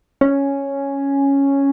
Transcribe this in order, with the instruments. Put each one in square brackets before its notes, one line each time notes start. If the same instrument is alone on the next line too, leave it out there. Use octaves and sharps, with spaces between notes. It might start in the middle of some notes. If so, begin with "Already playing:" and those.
[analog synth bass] C#4